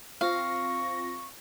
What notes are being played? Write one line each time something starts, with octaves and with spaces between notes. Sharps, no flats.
C4 F4 F5 C#6 A#6